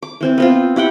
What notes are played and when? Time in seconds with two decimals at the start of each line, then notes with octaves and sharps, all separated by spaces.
0.02 D6
0.21 E3 C4 G#5
0.38 B3 C4 F4
0.76 E4 G4 F#5 G5